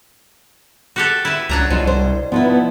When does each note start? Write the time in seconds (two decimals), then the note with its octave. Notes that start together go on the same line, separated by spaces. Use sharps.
0.96 F#4 G4 A4
1.25 E4 B4
1.49 C#2 F#3 D4 A#5
1.70 C2 B2 F3 F#3 F#4
1.87 C5
2.32 F3 B3 D#4 E4